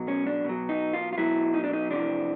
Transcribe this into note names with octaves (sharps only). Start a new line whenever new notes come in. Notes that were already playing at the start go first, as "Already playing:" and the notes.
Already playing: B2 F#3
C#4
D4
B2 F#3
D#4
F4
F4
B2 F#3 E4
D#4
D4
D#4
F2 C3 E3 D4